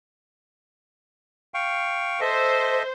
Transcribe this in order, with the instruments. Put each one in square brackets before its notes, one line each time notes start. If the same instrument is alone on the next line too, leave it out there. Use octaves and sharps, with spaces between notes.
[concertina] F5 G5 C#6
[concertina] A4 D#5 E5 [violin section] C5